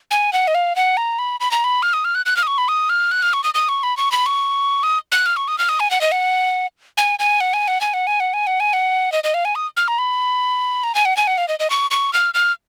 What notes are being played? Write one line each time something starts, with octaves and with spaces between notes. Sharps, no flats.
G#5
F#5
D#5
F5
F#5
A#5
B5
B5
A#5
B5
F6
D#6
F6
F#6
F#6
F6
D#6
C#6
B5
D#6
F6
F#6
F6
C#6
D#6
D#6
C#6
B5
C#6
B5
C#6
D#6
F#6
F6
C#6
D#6
F6
D#6
G#5
F#5
D#5
F#5
G#5
G#5
F#5
G#5
F#5
G#5
F#5
G#5
F#5
G#5
F#5
G#5
F#5
D#5
D#5
F5
G#5
D#6
F6
A#5
B5
A#5
G#5
F#5
G#5
F#5
F5
D#5
D#5
C#6
C#6
F6
F6